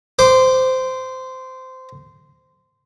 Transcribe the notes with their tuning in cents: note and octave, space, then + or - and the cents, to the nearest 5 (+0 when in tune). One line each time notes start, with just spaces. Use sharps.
C5 -15 D6 +0